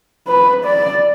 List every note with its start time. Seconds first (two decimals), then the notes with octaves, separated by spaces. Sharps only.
0.28 B4
0.65 D5